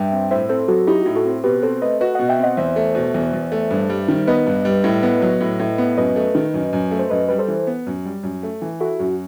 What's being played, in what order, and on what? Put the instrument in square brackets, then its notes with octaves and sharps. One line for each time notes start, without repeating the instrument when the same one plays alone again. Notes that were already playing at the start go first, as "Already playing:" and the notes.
Already playing: [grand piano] G2 [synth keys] E5 G5
[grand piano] C4
[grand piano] A2 [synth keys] C5 E5
[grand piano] C4 [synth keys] A4 C5
[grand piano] F#3 [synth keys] F#4 A4
[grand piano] D#4 [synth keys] E4 G4
[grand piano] A2 [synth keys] F#4
[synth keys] F#4 A4
[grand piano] C4
[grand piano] B2 [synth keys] G4 B4
[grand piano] C4 [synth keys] A4 C5
[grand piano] A3 [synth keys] B4 D#5
[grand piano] F#4 [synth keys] B4 D#5
[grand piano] B2 [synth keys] D#5 F#5
[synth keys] E5 G5
[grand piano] C4 [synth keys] D#5 F#5
[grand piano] E2 [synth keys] C5 E5
[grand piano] A3
B2
E2
E2
A3
G2
G3
D#3
[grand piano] B3 [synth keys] B4 D#5
[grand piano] G2
G3
A2
B3
F#3
A2
A2
B3
[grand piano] F#2 [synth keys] B4 D#5
[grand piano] A3
D#3
F#2
F#2
A3
[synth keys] C5
[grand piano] F#2 [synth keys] B4 D#5
[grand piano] G3 [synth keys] B4
[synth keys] A4 C5
[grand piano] E3
B3
F#2
G3
F#2
A3
E3
[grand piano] E4 [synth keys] F#4 A4
[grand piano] F#2 [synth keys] F#4